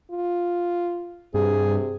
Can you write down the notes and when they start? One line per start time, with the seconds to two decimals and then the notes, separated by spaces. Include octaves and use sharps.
0.11 F4
1.34 G2 C3 G#4